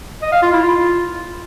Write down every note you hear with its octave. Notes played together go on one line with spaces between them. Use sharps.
D#5
F5
F4
E4
F4